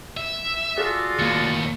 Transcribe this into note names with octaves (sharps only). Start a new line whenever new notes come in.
E5
F4 F#4 G#4 A4 D5
D#2 A2 A#3 C#7